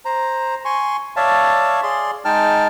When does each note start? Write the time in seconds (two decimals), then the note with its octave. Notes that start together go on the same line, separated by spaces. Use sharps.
0.05 C5 A#5
0.65 G#5 C6 C#6
1.16 C#5 D5 E5 F5 A5
1.83 G#4 D5 C6
2.25 G#3 D#4 G5 A5 F6